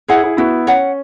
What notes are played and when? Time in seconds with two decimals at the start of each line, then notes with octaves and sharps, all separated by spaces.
0.08 E4 G#4 C#5 F#5
0.23 E4 G#4
0.37 B3 E4 F#4
0.67 C#4 C#5 F#5